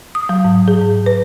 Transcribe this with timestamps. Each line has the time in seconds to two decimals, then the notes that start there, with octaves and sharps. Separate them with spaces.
0.15 D#6
0.29 F#3
0.44 G#2
0.68 G#4
0.81 G#2
1.06 B4